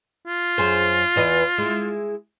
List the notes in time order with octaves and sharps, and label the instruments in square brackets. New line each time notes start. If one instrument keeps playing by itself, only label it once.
[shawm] F4
[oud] F#2 G#4 C5
E2 E3 D#5
G#3 E4